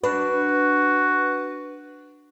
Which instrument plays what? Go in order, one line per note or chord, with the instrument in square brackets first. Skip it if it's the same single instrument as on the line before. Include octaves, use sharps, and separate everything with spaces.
[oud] D4 [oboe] F#4 [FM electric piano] B4